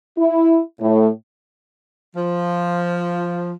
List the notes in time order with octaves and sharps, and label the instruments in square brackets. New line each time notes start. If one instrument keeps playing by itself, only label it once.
[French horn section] E4
A2
[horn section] F3